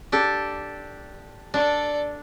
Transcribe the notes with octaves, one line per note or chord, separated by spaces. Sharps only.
D4 G4 A4
D4 A4 D5